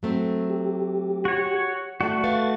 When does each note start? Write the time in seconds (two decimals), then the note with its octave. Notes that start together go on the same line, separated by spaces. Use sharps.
0.03 F#3 A3 C4
0.50 G4
1.25 F#4 C#5
2.01 A3 F#4 D5
2.24 B4 F5 C#6 A6